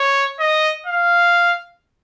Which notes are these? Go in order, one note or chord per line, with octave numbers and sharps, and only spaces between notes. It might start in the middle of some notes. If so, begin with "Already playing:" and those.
Already playing: C#5
D#5
F5